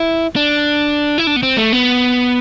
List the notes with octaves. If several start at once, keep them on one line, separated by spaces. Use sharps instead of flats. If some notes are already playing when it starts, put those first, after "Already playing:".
Already playing: E4
D4
E4
D4
B3
C4
A3
B3